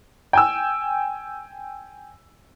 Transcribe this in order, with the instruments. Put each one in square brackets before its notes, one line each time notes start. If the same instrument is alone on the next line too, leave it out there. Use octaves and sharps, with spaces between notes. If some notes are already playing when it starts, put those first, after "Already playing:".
[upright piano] G5 G#5 E6